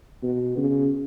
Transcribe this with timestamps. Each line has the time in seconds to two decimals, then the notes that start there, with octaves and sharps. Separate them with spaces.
0.22 B2
0.57 C#3